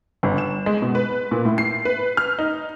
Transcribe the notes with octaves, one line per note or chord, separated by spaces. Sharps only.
G1
E7
G#3
B2
B4
A#2
A2
C7
B4
F6
D#4